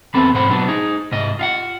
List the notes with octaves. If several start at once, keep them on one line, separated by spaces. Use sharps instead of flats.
E2 B3 C4 A4 B5
B1 G#2 C5 F#5 B5
B2 F#3 B3 D4
D#4 G#4
C2 G#2 D#5
F4 F5 F#5